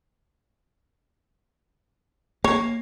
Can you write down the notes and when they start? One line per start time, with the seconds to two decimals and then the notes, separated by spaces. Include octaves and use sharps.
2.44 A#3 C#5